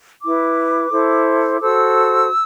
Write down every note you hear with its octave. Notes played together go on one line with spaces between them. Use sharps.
E4 B4 D6
E4 A4 C5
F#4 A4 C5 E6